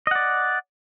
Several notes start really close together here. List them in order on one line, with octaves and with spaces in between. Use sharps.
D#5 F#5 D5